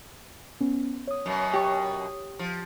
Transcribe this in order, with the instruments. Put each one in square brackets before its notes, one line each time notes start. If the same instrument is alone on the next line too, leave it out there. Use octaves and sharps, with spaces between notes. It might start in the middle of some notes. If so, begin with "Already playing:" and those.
[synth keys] B3 C#4
C#5 D#6
[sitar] F#2 B2
[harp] G4 C#6
[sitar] F3